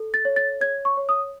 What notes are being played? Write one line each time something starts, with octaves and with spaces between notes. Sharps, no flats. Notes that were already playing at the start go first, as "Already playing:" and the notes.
Already playing: A4
A6
C#5
A6
C#5 G#6
C#6
C#5
D#6